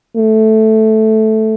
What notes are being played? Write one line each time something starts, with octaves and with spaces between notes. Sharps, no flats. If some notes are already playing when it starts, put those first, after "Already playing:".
A3